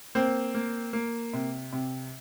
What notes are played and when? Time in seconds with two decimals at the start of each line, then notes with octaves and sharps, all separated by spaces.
0.15 A#3 C4
0.54 A#3
0.93 A#3
1.33 C3
1.72 C3